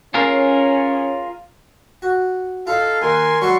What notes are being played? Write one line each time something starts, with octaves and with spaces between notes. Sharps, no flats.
C#4 F4 G#4 A#4
F#4
D#4 F4 A4 F5
D#2 A#4 G#5 C6
F#3 G3 A4 C6 C#6